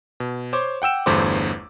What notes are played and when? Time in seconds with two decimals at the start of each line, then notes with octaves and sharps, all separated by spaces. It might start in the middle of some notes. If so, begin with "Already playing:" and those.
0.20 B2
0.53 C5 C#5 C6 D6
0.82 F#5 G5 E6 E7
1.06 G1 E2 G2 A3 C5 D6